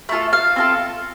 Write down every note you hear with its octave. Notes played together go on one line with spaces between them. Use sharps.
A3 D4 F4 A4
F5
C4 F4 A4